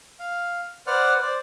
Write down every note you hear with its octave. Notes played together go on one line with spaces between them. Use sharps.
F5
B4 C5 D5 F#5 F6
C5 D5